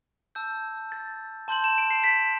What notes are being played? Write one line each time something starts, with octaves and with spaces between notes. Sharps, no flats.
A5 E6 G6
A6
A5 C6 G6 F#7
E7
D7
C7
B6